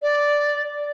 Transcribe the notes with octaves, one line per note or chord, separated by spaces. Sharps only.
D5